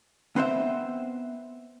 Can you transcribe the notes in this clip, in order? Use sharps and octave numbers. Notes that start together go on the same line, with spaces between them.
B3 C4 C5 E5